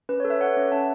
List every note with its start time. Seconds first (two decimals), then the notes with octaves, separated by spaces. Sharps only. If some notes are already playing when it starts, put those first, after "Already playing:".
0.09 C#4 B4
0.20 C#5
0.25 A4
0.30 B4 E5
0.41 A4 C#5 F#5
0.57 C#4
0.72 C#4 E5 A5